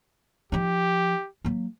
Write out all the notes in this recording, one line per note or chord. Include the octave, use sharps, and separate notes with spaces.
F3 D#4 G4
F#3 A#3